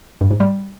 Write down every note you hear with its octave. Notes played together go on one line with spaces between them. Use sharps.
G2
G#2
G3